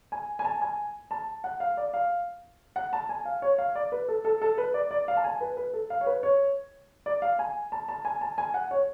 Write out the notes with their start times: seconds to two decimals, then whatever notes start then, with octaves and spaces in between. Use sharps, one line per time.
0.12 G#5
0.39 G#5
0.45 A5
0.61 G#5
1.11 A5
1.44 F#5
1.60 F5
1.77 D5
1.94 F5
2.76 F#5
2.93 A5
3.09 G#5
3.25 F5
3.42 C#5
3.58 F5
3.75 D5
3.92 B4
4.08 A4
4.25 A4
4.42 A4
4.58 B4
4.74 D5
4.91 D5
5.08 F5
5.17 A5
5.24 G#5
5.41 B4
5.57 B4
5.73 A4
5.90 F5
6.01 C#5
6.06 B4
6.23 C#5
7.06 D5
7.22 F5
7.39 G#5
7.72 A5
7.88 A5
8.05 G#5
8.21 A5
8.38 G#5
8.54 F#5
8.71 C#5